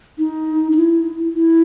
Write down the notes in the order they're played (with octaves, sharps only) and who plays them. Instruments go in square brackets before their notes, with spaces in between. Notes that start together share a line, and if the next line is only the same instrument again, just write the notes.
[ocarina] D#4
D#4
E4
E4